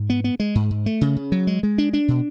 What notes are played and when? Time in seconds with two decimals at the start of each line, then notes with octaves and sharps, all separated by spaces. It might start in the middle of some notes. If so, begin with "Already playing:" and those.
Already playing: G#2
0.10 B3
0.24 B3
0.40 G#3
0.55 G#2
0.71 G#2
0.86 A3
1.01 C#3
1.16 C#3
1.32 F#3
1.47 G#3
1.63 G#3
1.78 D4
1.93 D4
2.08 B2